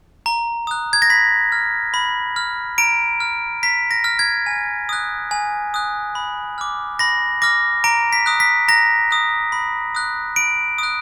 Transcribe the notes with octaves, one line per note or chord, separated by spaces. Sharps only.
A#5
D#6 F#6
G#6
A#6
B5 B6
F6
B5
F6
A#5 D7
F6
A#5 B6
A#6
F6
G#6
G#5
D#6 F#6
G#5
D#6 F#6
B5
D6 F6
B5 A#6
D6 F6 A#6
A#5 D7
B6
D#6 F#6
B6
A#5 A#6
D#6 F#6
B5
D#6 F#6
B5 D7
D#6 F#6